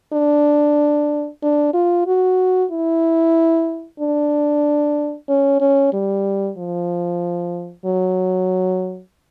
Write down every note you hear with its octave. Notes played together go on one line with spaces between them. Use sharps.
D4
D4
F4
F#4
E4
D4
C#4
C#4
G3
F3
F#3